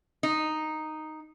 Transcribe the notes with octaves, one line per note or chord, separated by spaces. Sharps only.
D#4